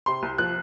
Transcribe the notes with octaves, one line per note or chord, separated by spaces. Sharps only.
C3 C6
C2
F3 F#6